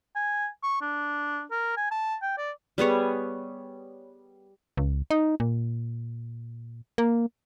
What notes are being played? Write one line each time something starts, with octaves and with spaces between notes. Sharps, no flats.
G#5
C#6
D4
A#4
G#5
A5
G5
D5
G3 B3 G#4 C#5
C#2
D#4
A#2
A#3